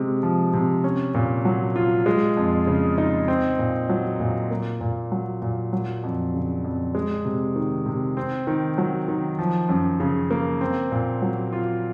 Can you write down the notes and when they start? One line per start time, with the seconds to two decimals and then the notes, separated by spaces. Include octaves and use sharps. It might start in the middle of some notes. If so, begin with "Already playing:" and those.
Already playing: C3 G#3
0.23 F3
0.54 C3
0.84 C#4
1.15 A#2
1.45 F#3
1.76 F4
2.06 G#3
2.37 F2
2.67 C#3
2.98 D#4
3.28 C4
3.59 A#2
3.89 F#3
4.20 A#2
4.51 A#3
4.81 A#2
5.12 F#3
5.42 A#2
5.73 F#3
6.04 F2
6.34 C#3
6.64 F2
6.95 G#3
7.25 C3
7.56 D#3
7.86 C3
8.17 C4
8.47 D#3
8.78 F#3
9.08 D#3
9.39 F3
9.69 F#2
10.00 C#3
10.31 A#3
10.61 C4
10.92 A#2
11.22 F#3
11.53 F4